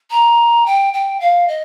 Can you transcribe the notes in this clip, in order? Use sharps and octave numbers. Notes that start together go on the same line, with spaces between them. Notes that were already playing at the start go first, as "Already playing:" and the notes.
A#5
G5
G5
F5
D#5